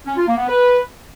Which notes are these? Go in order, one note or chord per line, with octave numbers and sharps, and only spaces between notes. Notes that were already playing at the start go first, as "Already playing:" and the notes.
C#4
F4
A#3
B3
B4